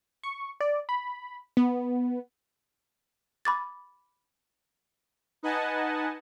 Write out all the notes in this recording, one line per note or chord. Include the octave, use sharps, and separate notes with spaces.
C#6
D5
B5
B3
B5 D6 A6
D#4 B4 D#5 F#5 G#5 A5